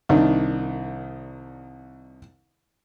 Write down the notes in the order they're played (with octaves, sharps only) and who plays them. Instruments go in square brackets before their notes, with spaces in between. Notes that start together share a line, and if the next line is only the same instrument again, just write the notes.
[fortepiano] C2 D#3 D4